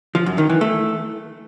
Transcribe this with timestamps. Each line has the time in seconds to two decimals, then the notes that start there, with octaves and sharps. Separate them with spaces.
0.15 F3
0.26 F#2
0.38 D#3
0.50 E3
0.61 A3